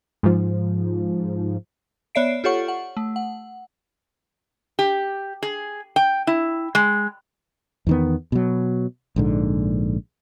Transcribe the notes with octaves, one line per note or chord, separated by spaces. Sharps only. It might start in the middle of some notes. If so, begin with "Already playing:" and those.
G#2 F3
B3 C#5 D5 E5 C7 D7
F4 G4 A4 C#5 F#5 C#6
F#5
A3
F#5
G4
G#4
G5
E4
G#3
E2 D#3 B3
B2 F#3
A#1 G#2 D3